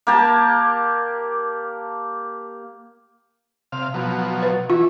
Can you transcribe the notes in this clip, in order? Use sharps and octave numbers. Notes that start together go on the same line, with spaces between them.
A#3 G4 A5
C3 F5
B2 F3 F#3
B4
E3 F4